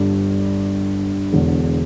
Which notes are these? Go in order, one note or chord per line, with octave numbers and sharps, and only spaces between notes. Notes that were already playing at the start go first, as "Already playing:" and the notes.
Already playing: G1 G2 D3 G3 D4
E1 E2 D3